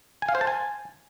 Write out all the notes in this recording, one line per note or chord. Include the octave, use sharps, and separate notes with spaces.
G#5
F5
C5
A5
G#5